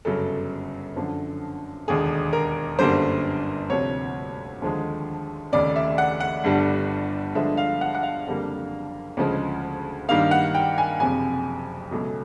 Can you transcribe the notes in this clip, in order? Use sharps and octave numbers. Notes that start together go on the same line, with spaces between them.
G1 F#2 C#3 F#3 A4
F#2 D3 F3
E1 D#2 D3 G#4
A#4
G1 F#2 D3 G3 A#3 C5
D2 C3 F3 C#5
D#2 D3 F3 G#3
F1 D#2 C#3 D5
E5
F#5
F#5
G1 G2 D3 G3
G2 D3 F3 G#3 E5
F5
F#5
F#5
F5
F#1 F2 D3 G3 A#3
D2 C#3 F3 G#3
G2 D#3 G3 A#3 F5
F#5
G5
G#5
F#1 F2 C3 G#5
C#2 B2 F#3 A3